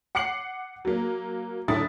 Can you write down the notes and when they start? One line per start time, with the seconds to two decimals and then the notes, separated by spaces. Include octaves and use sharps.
0.15 F#5 D6 C7 C#7 F#7
0.85 F#3 A#3
1.68 F#1 D3 E4 A4 D#6 A6